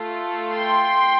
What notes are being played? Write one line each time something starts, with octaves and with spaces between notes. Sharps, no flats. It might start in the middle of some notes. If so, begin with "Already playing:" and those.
Already playing: A3 F4 A4
G5 C6